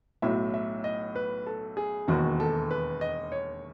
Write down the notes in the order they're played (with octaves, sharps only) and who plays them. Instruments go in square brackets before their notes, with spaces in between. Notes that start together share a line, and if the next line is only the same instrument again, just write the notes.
[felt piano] B1 A2 F#3 [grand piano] E5
[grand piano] E5
D#5
B4
A4
G#4
[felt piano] E1 D#2 D#3 [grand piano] F#4
[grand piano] A4
B4
D#5
C#5